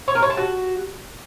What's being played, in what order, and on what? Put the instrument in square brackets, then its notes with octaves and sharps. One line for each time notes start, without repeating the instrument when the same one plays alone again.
[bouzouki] C#5
A#4
C#5
A5
F#4